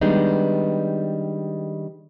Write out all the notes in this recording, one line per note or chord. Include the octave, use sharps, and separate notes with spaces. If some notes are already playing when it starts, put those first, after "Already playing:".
D#3 G3 G#3 B3 D4 D#4